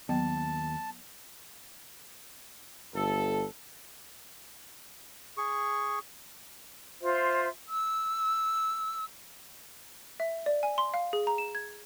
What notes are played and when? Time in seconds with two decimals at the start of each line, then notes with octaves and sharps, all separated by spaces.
0.09 D#2 F#3 B3 G5 A5
2.94 G1 A4
5.37 G#4 C#6
7.00 F4 C5 E5
7.68 E6
10.20 E5
10.46 D5
10.63 G#5
10.78 C6
10.94 F5
11.13 G#4
11.27 A#5
11.38 E7
11.55 G#6